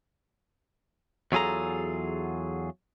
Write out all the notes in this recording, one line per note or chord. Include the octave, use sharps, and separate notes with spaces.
E2 F#3 F4 G#4 A4 A#5